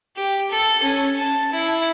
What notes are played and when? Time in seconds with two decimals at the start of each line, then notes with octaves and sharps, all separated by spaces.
0.16 G4
0.51 A4
0.83 C#4
1.18 A5
1.53 E4